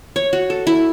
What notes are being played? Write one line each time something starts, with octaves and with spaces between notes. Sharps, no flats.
C#5
F#4
A4
E4